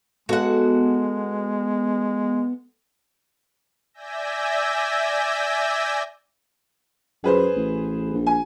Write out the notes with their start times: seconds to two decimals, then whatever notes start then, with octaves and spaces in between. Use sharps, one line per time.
0.29 G#3 B3 F#4 A4 F#5
3.94 D5 E5 G#5 E6 G6 A#6
7.24 F#2 G#4 B4 C5
7.56 A1
8.14 A#1
8.27 G#5